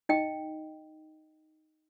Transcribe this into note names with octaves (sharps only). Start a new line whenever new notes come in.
D#4 D#5 G5